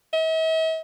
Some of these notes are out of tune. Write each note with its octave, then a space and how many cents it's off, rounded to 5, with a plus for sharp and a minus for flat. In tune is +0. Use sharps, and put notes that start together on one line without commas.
E5 -45